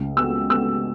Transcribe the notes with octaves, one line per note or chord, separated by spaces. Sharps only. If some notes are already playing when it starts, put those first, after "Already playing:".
Already playing: C#2
B3 E6
B3 E6